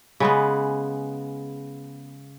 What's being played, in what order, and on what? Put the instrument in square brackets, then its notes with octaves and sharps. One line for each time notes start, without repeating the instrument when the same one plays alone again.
[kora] C#3 G#3 B3